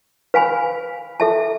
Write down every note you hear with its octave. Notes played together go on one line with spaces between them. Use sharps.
B4 F5 G#5 B5
A4 E5 A5